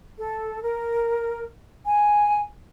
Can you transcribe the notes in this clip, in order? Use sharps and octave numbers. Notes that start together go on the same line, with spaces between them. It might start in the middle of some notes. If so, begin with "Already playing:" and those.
A4
A#4
G#5